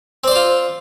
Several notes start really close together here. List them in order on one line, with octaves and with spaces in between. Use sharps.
C4 D5 C5 F4